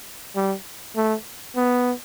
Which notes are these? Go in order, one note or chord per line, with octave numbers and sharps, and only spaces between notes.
G3
A3
B3